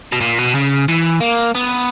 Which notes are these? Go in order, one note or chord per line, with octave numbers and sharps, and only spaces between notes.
B2
A#2
B2
C#3
E3
A#3
B3